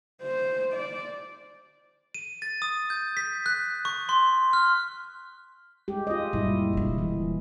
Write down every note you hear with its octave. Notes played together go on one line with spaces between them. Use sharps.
C5
D5
D#7
A6
D#6
G6
B6
F#6
C#6
C6
F6
G#3 G4
F4 D#5
F#2 A#2 G3 E4
E1 D3
E3